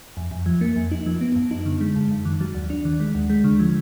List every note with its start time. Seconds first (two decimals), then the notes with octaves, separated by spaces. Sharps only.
0.17 F2
0.31 F2
0.46 F3
0.61 A#3
0.76 F2
0.91 D#4
1.06 F3
1.21 B3
1.36 F#2
1.51 D#4
1.66 D3
1.81 G#3
1.95 F#2
2.11 F#2
2.25 D#3
2.41 F#3
2.54 D#2
2.70 D4
2.85 D#3
3.00 G#3
3.15 D#2
3.30 G#3
3.44 D3
3.59 F3